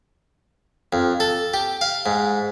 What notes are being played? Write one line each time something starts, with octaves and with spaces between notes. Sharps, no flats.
F2
A4
G4
F5
G#2